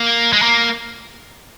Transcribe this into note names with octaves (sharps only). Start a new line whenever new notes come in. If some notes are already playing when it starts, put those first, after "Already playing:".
Already playing: A#3
G#3
A#3